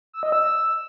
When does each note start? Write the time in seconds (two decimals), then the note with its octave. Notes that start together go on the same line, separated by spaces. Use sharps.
0.13 E6
0.23 D#5
0.32 E6